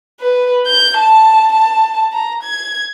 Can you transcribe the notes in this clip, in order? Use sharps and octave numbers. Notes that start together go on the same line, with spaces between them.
B4
G6
A5
A5
A#5
G#6